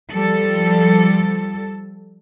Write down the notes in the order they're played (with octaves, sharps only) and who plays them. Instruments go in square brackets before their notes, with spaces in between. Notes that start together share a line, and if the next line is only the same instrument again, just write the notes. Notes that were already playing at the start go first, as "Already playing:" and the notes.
[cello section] F3 G3 A4